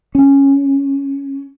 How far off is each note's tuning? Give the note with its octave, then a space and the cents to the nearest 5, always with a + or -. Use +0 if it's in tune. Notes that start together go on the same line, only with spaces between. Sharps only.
C#4 +0